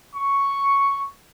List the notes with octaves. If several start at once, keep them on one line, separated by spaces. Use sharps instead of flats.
C#6